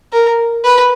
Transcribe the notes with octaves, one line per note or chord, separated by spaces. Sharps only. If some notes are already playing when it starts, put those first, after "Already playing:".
A#4
B4